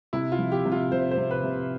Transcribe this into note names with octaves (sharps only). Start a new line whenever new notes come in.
C3 E4
F4
F3
G4
C3
F4
C3 C5
C5
C3
B4
C3